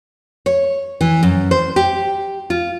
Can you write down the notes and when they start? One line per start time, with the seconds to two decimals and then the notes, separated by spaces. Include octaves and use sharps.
0.46 C#5
1.01 E3
1.23 F#2
1.51 C5
1.76 G4
2.50 F4